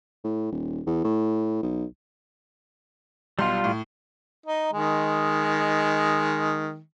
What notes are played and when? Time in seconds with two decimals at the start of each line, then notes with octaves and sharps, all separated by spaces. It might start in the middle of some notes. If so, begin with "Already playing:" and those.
0.24 A2
0.52 D#1
0.86 E2
1.04 A2
1.63 B1
3.39 B1 G3 F4 C6
3.64 A2
4.46 D#4
4.74 D#3 G#3